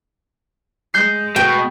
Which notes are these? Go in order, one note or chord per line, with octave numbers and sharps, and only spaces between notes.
G#3 G6 C7
B2 G5